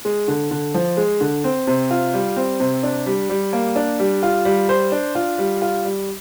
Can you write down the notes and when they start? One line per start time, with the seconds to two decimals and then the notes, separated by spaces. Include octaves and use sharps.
0.05 G#3
0.28 D3
0.51 D3
0.74 F3
0.97 G#3
1.21 D3
1.44 C4
1.67 C3
1.91 F4
2.13 G3
2.36 C4
2.60 C3
2.83 D4
3.06 G3
3.29 G3
3.53 A#3
3.76 D4
3.99 G3
4.23 F4
4.45 G3
4.69 C5
4.92 D4
5.15 F4
5.38 G3
5.62 F4
5.85 G3